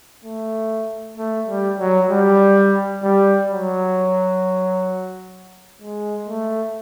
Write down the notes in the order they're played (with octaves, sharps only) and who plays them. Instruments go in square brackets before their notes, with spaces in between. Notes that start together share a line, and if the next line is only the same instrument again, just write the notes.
[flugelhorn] A3
A3
G3
F#3
G3
G3
F#3
G#3
A3